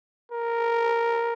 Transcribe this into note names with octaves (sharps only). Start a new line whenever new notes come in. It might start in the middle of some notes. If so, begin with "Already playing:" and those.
A#4